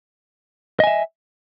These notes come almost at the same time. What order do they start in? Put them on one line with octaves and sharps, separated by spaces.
D#5 G#5 E5